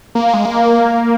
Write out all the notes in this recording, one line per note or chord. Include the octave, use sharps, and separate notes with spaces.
A#3
G#3
A#3